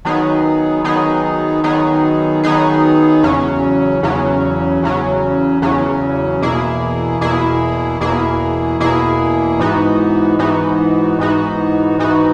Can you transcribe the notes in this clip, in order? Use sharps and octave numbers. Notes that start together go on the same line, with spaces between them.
D#3 F#3 B3 D#4 G#4
D#3 F#3 B3 D#4 G#4
D#3 F#3 B3 D#4 G#4
D#3 F#3 B3 D#4 G#4
E2 C#3 F#3 C#4
E2 C#3 F#3 C#4
E2 C#3 F#3 C#4
E2 C#3 F#3 C#4
E2 B2 A#3 E4 G#4
E2 B2 A#3 E4 G#4
E2 B2 A#3 E4 G#4
E2 B2 A#3 E4 G#4
G#2 E3 B3 D#4 F#4
G#2 E3 B3 D#4 F#4
G#2 E3 B3 D#4 F#4
G#2 E3 B3 D#4 F#4